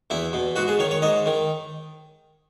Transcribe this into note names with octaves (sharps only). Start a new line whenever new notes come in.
E2 E4
B2
G#2 F#4
G#4
D#3 C#5
C#5
G#2 D#5
D#3